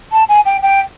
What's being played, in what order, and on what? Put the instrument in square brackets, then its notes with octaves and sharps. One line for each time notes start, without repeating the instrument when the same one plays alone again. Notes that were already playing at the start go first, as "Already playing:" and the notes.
[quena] A5
G#5
G5
G5